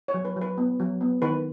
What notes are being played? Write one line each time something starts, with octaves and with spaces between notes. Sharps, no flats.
C#5
F#3
B4
F#3
B4
B3
F#3
B3
D#3 B4